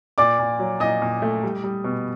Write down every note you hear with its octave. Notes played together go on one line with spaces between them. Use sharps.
A#2 D5 D6
A#2
F#3
A#2 D#5 D#6
A#2
A3
G3
G3
B2